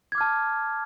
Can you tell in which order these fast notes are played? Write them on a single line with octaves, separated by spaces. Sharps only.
G#6 D6 F6 A5